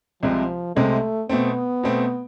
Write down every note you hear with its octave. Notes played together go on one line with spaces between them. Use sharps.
C2 C3 F3 G#3 C4
C2 C3 G#3 A3 C4
B2 A3 B3 C4
B2 A3 C4